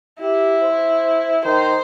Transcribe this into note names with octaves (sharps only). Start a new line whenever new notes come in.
E4 G4
C5
D#3 C5